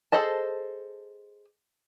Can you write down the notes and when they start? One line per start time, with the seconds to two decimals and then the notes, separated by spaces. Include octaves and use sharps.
0.12 G#4 A4 C5 D#5 A5